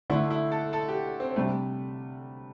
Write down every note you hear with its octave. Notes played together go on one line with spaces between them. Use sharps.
D3 A3 D4 E4
E4
A4
A4
G4
C4
C3 G3 A3 D4